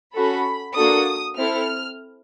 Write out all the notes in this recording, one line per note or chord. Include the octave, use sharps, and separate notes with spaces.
C#4 F#4 A4 B5
A#3 D4 F#4 A4 D#6
C4 E4 A4 F6